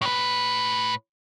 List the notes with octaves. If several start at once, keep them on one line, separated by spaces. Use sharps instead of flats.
A2 B4